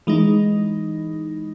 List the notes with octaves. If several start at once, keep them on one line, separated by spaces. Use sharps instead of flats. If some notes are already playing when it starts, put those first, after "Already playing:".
E3 G#3 D#4